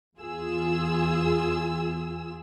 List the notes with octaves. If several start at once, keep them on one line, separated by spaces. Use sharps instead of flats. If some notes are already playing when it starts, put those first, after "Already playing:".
E2 F4 G#4 E6